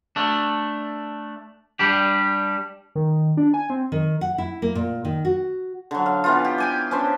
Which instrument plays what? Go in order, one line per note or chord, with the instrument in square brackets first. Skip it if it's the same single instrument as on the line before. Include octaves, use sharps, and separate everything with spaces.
[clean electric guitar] A3 D4
G3 D4 G4
[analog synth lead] D#3
D4
G#5
C4
[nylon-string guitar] D#3
F#5
E4
A#3
A#2
D#3
F#4
[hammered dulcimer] D3 F#3
F5
E3 B3 F4
G4
G5 G#5 D6
C#4 D4 B4 C5